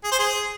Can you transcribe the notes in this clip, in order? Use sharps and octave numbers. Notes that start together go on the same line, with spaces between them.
G#4
C5
G#4